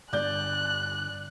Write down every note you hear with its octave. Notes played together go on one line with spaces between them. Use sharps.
G2 D3 B3 D5 F#6 G6